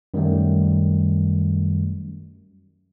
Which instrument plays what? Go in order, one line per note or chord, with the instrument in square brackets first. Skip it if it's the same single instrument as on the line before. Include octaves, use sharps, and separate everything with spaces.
[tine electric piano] F#2 D#3 F#3 G3 A3